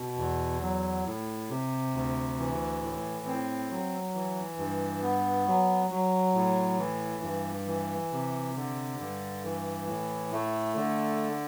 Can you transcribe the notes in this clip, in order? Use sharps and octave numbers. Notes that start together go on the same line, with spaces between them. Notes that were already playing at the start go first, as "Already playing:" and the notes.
Already playing: B2
E2
F#3
A2
C3
D2
E3
A2
C4
F#3
E3
G2
B3
F#3
F#3
A2
E3
G2
E3
C3
D3
G2
E3
A2
A3
D3